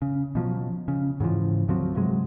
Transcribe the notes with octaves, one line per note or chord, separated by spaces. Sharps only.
C#3
B2 F3 F#3
C#3
G#2 C#3 E3 F3
D2 F3 F#3 C4
G2 C3 F#3 G#3